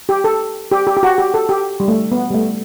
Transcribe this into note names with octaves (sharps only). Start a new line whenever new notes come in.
G4
A4
G4
G4
G4
F#4
G4
A4
G4
G3
A3
B3
G3
A3